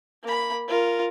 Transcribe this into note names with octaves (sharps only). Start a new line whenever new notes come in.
A#3 B5
F4 A#4